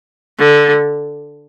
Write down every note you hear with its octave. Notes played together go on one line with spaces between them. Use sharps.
D3